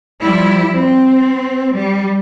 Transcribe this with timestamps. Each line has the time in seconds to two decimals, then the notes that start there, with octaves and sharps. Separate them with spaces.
0.21 F3 G3 E4
0.74 C4
1.74 G3